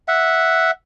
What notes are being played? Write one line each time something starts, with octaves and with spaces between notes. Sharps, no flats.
E5 F#5